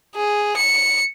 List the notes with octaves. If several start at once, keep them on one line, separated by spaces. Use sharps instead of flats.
G#4
C#7